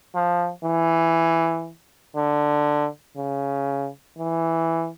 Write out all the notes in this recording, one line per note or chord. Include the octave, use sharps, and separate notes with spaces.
F3
E3
D3
C#3
E3